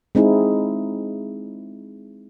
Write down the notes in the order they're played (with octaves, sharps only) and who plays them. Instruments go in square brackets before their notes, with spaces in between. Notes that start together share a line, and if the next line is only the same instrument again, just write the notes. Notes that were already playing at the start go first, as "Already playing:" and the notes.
[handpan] G#3 C4 D#4 E4 G#4